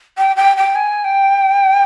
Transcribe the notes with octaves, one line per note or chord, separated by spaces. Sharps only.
G5
G5
G5
G#5
G5